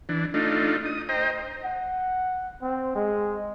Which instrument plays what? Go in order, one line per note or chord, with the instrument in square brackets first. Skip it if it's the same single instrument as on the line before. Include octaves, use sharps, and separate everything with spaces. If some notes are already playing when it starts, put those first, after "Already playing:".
[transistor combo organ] E3 D4
A3 D4 D#4 F4
D#6
C5 D#5 G5 A#5
[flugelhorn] F#5
C4
G#3